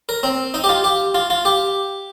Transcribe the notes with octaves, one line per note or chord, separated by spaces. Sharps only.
A#4
C4
D#4
G4
F4
G4
F4
F4
G4